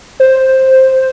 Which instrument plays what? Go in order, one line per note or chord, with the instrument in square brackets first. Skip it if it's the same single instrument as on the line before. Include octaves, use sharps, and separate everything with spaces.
[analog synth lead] C5